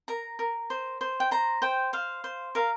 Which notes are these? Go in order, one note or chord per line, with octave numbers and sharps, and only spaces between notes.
A#4 A#5
A#4
C5
C5
G5
C5 A#5
C5 G5
C5 F5
C5
A#4 F5